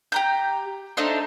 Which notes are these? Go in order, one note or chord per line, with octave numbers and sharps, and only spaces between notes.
G4 A#5 G6
A3 D4 D#4 C5